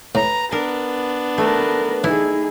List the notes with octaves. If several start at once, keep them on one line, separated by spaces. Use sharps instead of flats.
A2 B4 A#5
B3 D4 A#4
A3 A#4 B4
E3 D#4 E4 G#4